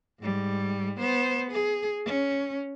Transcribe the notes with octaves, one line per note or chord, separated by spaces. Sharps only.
G#2 G3
B3 C5
G#4
C#4